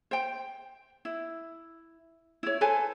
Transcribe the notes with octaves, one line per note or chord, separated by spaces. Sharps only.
C5 G5
E4
E4 C#5
A4 B4 C5 G#5